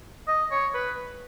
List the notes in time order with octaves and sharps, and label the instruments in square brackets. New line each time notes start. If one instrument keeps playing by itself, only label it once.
[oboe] D#5
C#5
B4